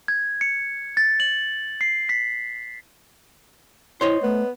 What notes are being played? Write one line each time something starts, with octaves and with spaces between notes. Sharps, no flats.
G#6
C#7
A6
F#7
C7
B6
E4 C5 C#5 D#5
A3 B3